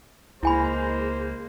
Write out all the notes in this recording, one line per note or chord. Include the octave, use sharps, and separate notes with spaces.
C#2 G#3 A#3 E4 C5 G#5 B5